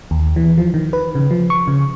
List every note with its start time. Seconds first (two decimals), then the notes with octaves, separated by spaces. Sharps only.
0.11 D#2
0.36 E3
0.58 F3
0.74 D#3
0.93 B4
1.15 C#3
1.31 F3
1.50 C#6
1.68 C#3